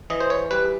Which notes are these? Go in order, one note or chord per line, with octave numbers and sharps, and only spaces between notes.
E3 D#5
C5
C#5
G3 B4